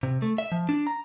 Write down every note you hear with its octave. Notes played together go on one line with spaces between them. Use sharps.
C3
A3
E5
F3
D4
A#5